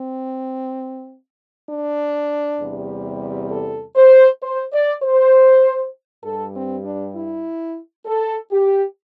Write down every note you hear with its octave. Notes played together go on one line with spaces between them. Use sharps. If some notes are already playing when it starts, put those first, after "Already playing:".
Already playing: C4
D4
E2 C3 G3
A4
C5
C5
D5
C5
G2 G3 A4
C4
D4
E4
A4
G4